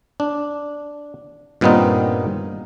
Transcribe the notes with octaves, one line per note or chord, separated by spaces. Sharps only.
D4
G2 A#2 D#3 B3 C4 D#4